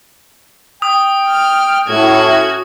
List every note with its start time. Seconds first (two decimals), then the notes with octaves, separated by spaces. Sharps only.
0.82 G5 D#6
1.28 F6
1.88 A2 C#4 F#4 G#6